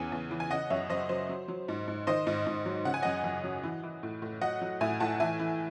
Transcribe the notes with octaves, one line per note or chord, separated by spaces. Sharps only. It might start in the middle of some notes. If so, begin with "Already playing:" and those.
Already playing: E2 C#3 G#5
E2
E3
G#5
C#3 D#5 F#5
F#2 C#5 E5
F#2 C5 D#5
F#3 C5
F#3
F#3
G#2
G#2
D#3 C5 D#5
G#2
G#2
F#3
C#3 F#5
G#5
F#2 D#5 F#5
F#2
F#3
E3
E3
A2
A2
F#3 D#5 F#5
F#3
A2 E5 G#5
A2 F#5 A5
E3 E5 G#5
E3